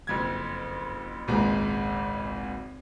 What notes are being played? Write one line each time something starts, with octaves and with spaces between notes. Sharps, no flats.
F#1 F2 G#6
G#1 C#2 A#2 G#3 A#5